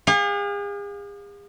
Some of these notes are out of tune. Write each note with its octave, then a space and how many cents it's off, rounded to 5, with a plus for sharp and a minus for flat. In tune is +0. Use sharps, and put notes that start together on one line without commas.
G#4 -40 F5 +35